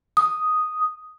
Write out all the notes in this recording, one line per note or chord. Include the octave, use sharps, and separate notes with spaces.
D#6